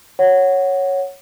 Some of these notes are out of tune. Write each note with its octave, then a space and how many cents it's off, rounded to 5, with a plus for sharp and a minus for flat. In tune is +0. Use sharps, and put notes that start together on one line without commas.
C#5 -5 F#5 +0